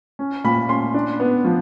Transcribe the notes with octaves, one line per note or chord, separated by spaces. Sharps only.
C#4
A#2 B5
C#4 C6
D4
B3
F3